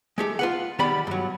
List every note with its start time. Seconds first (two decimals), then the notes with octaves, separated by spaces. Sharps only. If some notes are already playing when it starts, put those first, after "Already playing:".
0.18 G#3 A3 G4
0.39 F4 B4 F#5
0.79 D#3 G3 B3 G4 D5 B5
1.07 G2 F#3